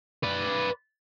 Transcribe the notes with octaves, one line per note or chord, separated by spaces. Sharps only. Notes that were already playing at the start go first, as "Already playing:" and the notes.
B4 D5